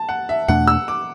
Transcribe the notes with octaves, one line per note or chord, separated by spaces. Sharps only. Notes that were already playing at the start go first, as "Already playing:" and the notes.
Already playing: A5
F#5
E5
E2 B2 A3 D4 F#5
E6
D6